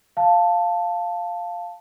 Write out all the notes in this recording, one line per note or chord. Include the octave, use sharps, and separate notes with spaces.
F5 A5